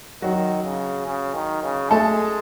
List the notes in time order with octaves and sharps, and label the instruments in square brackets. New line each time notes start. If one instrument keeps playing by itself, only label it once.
[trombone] D#3 [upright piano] F#3 F#4
[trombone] C#3
C#3
D#3
C#3
[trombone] G#3 [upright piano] A3 A4